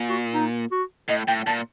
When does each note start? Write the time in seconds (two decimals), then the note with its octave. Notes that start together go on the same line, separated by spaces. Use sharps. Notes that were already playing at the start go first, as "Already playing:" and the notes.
Already playing: A#2
0.09 F#4
0.34 D#4
0.72 F#4
1.09 A2 D#5
1.28 A2 G5
1.47 A#2 A5